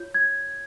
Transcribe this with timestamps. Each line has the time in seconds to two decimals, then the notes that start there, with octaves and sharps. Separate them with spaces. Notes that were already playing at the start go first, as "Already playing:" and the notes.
Already playing: F4 C#5 G6
0.14 G#6